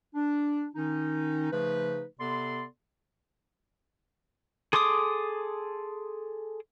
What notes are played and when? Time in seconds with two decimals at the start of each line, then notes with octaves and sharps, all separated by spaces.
0.14 D4
0.75 D#3 C#4 D#4
1.51 C#3 F3 A3 D#4 B4
2.20 C3 B3 A4 D5 C6
4.73 G#4 A4 C6 D6 D#6